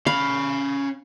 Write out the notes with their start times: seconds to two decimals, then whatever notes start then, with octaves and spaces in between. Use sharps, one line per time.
0.07 C#4 F5 B5